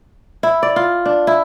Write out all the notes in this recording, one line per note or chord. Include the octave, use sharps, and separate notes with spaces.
E4
D5
F4
D4
E4